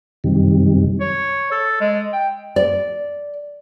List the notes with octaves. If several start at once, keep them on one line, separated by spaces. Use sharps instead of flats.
F#2 C3 D#3 G3
C#5
A4
G#3
G5
D5